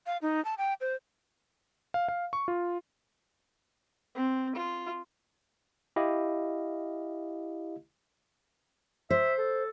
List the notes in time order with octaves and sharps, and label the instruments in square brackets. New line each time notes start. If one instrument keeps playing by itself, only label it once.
[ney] F5
D#4
A5
G5
C5
[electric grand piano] F5
F5
C#6
F4
[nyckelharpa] C4
F4
[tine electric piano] E4 G4 D#5 F5
[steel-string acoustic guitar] C5 [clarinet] E5
[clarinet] A4